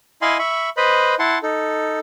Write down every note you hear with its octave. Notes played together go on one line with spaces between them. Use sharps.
E4 D#5 F5 G#5 B5 C6
E5 B5 C#6
B4 C5 D#5 B5
E4 F#5 A5 C6
D#4 A4